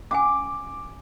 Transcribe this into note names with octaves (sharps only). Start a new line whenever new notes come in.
C#4 F#5 G#5 D6